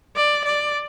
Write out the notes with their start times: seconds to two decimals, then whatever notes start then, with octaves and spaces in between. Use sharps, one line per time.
0.16 D5
0.44 D5